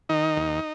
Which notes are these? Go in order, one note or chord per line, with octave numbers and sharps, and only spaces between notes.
D#3 D#4
D#2